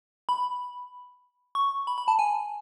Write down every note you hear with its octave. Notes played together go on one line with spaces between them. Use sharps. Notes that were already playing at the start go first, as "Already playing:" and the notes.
B5
C#6
B5
B5
A5
G#5